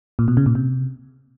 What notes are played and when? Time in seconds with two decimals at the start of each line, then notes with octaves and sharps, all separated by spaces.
0.19 A#2
0.28 B2
0.37 C#3
0.46 A#2
0.55 C3